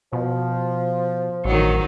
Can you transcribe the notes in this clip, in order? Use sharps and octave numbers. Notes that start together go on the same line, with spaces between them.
B2 F3
A1 D#3 F#3